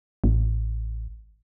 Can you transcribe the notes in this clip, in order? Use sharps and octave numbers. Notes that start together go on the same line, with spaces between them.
A1